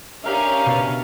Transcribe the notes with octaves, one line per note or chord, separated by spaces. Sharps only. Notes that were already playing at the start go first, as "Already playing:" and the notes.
C#4 D4 G4 A#4 E5 F5
B2